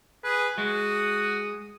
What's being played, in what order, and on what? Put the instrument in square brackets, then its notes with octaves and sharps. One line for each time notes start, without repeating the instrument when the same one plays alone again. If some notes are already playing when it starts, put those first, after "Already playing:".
[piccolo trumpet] G#4 [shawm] B4
[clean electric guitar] G#3 [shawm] F#4 [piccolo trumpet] D#6